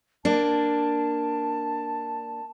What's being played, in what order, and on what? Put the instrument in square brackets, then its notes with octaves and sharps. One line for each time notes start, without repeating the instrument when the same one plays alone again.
[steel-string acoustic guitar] A#3 D4 [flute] A5